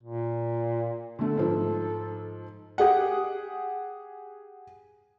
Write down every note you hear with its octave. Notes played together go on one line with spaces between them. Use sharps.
A#2
D3 A3 A4
G#2 F3
G4 G#4 F#5